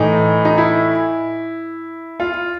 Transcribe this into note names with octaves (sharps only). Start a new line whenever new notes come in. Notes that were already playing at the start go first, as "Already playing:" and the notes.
Already playing: A2 E3 A3 D#4
D#4
E4
F4